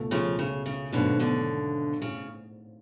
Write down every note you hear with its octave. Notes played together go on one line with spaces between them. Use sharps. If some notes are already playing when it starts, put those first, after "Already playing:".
Already playing: C#2 B2 A3
C#3 F3
C#3
C#3
G#1 G#2 B2 D3 F#3 A3 C#4
B2 D3
A2 C#3